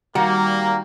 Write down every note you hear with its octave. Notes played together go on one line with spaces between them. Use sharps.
D#3 G3 A#3 F#4